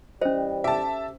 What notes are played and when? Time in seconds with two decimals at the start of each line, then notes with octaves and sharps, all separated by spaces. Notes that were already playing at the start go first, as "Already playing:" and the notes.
0.22 E3 G3 C#4 C5 D#5
0.64 G4 A4 E5 A5